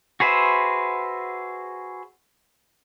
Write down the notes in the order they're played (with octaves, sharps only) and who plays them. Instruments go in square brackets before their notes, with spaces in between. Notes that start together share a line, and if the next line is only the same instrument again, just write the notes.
[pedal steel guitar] F#4 G#4 B4 C5 E5